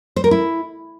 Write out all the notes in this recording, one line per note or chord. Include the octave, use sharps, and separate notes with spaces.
C5
A#4
E4